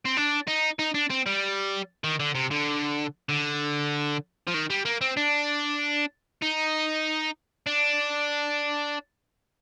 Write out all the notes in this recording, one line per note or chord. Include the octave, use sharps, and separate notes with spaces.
C4
D4
D#4
D#4
D4
C4
G3
D#3
D3
C3
D3
D3
F3
D#3
G3
A#3
C4
D4
D#4
D4